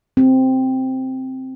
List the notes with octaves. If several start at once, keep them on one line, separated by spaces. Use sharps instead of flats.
C4